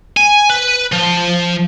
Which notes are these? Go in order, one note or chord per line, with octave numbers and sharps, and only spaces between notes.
G#5
B4
F3